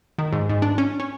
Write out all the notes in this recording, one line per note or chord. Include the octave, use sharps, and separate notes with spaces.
D#3
G#2
G#2
D4
C#4
C#4